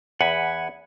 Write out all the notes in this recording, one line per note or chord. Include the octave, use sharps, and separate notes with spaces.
E2 F#5 G#5 B5